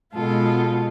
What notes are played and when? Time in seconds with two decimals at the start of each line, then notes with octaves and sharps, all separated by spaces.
0.14 B2 G#3 B3 F4 A4